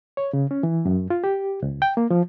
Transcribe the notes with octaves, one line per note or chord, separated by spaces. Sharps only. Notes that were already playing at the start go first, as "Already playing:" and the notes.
C#5
C#3
C#4
E3
F#2
F4
G4
C#2
G5
A#3
F3